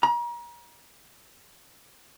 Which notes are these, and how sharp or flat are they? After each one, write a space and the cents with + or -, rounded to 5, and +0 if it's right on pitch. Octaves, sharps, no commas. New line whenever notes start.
A#5 +35